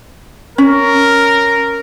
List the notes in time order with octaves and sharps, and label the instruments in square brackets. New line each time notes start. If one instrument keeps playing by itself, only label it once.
[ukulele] C#4 [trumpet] A#4